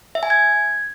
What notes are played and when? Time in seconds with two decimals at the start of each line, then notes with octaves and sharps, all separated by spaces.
0.15 E5
0.23 G#5
0.30 G#6